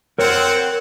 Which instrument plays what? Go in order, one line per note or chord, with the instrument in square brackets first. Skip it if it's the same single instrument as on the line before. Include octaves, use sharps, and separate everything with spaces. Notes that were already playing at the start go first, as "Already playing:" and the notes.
[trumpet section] C4 F#5 [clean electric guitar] A#4 C#5